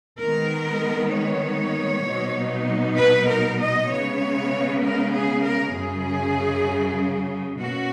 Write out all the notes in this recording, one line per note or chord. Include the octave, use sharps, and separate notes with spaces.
D#3 G#3 B3 A#4
C#5
B2 F#3 B3 D#4
B4
A#4
D#5
C#3 G#3 B3 C#5
A#4
G#4
A#4
F#2 C#3 F#3 G#4
B2 A#3 C#4 F#4